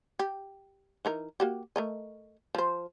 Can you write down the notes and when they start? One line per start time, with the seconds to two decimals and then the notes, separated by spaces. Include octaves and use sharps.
0.19 G4
1.05 E3 D#4 A#4
1.40 A#3 F#4 G4
1.76 A3 A#4 D#5
2.55 F3 C5